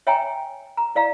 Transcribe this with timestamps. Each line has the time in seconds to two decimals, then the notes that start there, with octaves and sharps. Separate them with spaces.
0.07 C#5 E5 G5 G#5 A#5
0.77 A#5
0.95 E4 D5 F5 A#5